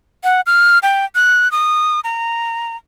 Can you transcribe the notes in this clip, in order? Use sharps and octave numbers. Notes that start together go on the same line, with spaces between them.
F#5
F6
G5
F#6
D#6
A#5